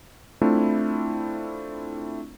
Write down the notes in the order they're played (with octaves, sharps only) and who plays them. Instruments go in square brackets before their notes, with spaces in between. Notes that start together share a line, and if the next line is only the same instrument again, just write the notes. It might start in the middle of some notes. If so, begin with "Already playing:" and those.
[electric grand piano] A3 C4 D4 E4 F4